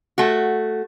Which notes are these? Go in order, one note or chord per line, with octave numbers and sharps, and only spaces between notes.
A3 F#4